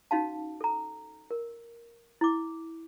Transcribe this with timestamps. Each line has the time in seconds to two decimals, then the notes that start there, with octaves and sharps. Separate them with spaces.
0.11 C#4 D#4 F#4 F5 A5
0.61 A4 A#5
1.31 A#4
2.21 E4 D6